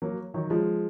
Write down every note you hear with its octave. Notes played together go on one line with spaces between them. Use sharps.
F#3 A#3
D#3 F#3
F3 G#3